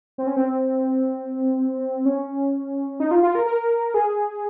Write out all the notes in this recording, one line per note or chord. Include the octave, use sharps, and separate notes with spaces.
C4
C#4
C4
C#4
D#4
F4
F4
A#4
A#4
G#4